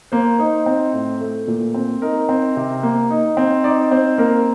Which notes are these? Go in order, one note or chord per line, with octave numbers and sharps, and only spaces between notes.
A#3 C5
D#4 C5
C4
A2
A3
A#2
C4
D#4 A#4
C4
C3
A#3
D#4
C4
D#4 D5
C4 C5
A#3 A#4